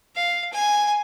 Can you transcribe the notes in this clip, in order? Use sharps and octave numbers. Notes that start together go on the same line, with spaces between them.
F5
G#5